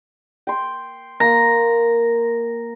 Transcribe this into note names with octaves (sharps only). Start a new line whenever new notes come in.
G5 C6
A#3 A#5